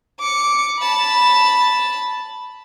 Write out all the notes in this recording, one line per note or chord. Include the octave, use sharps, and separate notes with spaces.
D6 C#7
A5 B5